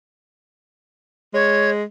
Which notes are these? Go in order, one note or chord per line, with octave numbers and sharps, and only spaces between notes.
G#3 C#5